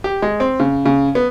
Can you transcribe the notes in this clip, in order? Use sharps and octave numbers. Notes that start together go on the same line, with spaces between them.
G4
G#3
C4
C#3
C#3
B3